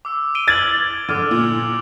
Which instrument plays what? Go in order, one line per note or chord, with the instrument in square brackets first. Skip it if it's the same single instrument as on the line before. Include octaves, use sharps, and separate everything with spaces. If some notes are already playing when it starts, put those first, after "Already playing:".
[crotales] D6 E6
D7 D#7 G7
[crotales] E6 F6 F#7 [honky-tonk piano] G#6 A6
[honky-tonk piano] D3 [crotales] D6 F6 D#7
[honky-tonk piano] A#2